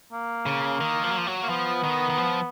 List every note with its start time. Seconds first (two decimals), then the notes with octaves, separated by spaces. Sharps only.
0.12 A#3
0.46 C#3
0.81 D#3
1.04 F3
1.11 F#3
1.18 F3
1.27 F#3
1.43 A#3
1.49 F3 B3
1.84 D#3
2.10 D#3
2.17 F3